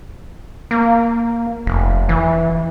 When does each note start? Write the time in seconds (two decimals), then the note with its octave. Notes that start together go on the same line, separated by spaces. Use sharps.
0.71 A#3
1.66 F1
2.09 E3